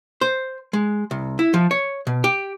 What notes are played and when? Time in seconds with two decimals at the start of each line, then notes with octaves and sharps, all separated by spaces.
0.21 C5
0.73 G#3
1.11 C2
1.39 E4
1.54 F3
1.71 C#5
2.07 B2
2.24 G4